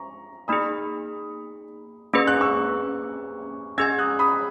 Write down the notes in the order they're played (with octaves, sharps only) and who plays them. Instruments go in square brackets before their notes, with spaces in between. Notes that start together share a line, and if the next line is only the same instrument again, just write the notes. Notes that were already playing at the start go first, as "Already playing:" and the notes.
Already playing: [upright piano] A#5 C#6
[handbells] A#3 D#4 G#4 [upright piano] B5 D#6
[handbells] A#3 C#4 G#4 B4 [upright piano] E6
[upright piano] F#6
C#6 E6
[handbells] C#4 G#4 D#5 G#5 [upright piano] E6 G#6
[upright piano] D#6 F#6
B5 D#6